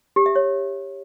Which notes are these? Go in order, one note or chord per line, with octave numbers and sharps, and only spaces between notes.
G4
E5
C#5